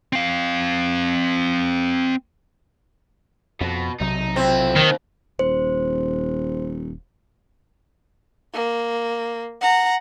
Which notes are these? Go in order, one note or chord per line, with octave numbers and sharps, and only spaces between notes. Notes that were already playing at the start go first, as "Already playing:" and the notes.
C4 F5
F2 B2
B1 C3 F#3 D#4
F2 C4 E4
D#2 D#3
D#1 C5
A#3
F#5 A#5